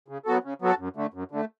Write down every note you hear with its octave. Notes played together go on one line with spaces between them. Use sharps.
C#3
F#3 B3 F#4 A4
C#3
F#3 B3 F#4 A4
F#2
D3 A3
F#2
D3 A3